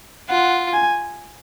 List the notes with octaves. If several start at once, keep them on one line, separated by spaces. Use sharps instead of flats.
F4 F#5
G#5